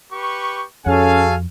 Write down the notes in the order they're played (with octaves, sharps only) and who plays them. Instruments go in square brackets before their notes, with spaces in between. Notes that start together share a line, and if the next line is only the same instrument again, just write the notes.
[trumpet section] G4 B4 C#6
[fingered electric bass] F2 [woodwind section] C#3 F#4 A4 [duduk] C#4 [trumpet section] F5 G#5